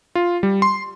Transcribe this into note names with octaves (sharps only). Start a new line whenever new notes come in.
F4
G3
C6